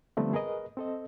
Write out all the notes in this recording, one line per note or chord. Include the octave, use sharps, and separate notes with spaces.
D3 F3 G3 A3 B3 C4
G#4 A#4 B4 D#5
C4 A4 D#5